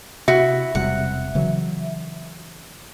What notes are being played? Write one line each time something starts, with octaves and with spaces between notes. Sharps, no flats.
C3 E4 F#4 E5
E1 C3 G3 F#5
C#3 E3 F#3